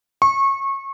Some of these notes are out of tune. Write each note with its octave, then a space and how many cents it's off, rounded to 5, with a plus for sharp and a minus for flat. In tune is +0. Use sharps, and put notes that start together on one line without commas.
C#6 -25